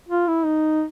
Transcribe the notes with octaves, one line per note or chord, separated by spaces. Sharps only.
F4
E4
D#4